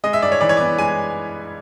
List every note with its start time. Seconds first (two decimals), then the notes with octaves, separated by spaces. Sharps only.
0.04 G#3 D#5
0.13 E5
0.22 G2 D5
0.32 C#5
0.41 E3 D5
0.49 C#5
0.57 B3 D5
0.78 G#3 G#5